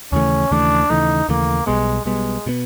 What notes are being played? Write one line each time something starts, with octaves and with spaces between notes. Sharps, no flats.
D#2 C#3 E3 A3 C#4
D#2 C#3 E3 A3 D4
D#2 C#3 E3 A3 D#4
D#2 C#3 E3 A3 A#3
B1 B2 G3 G#3 B3
B1 B2 G3 G#3 B3
B2 G3 B3